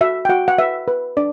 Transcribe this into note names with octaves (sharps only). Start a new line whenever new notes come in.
F#4 E5
G5
F#4 F#5
F#5
B4 E5
B4
D4 D5